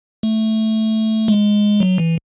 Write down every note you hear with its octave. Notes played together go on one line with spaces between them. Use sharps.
A3
G#3
F#3
E3